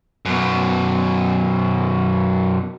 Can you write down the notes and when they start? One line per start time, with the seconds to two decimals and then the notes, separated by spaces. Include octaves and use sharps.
0.25 F#2 B2